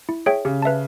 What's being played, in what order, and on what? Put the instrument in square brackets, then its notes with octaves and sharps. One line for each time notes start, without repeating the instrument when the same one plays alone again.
[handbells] E4
G#4 C#5 E5 G5
[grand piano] C#3 [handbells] G4
[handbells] B4 E5 A5